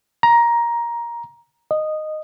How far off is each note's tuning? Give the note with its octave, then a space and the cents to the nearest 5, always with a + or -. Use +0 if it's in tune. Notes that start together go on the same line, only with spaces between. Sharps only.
A#5 +15
D#5 -10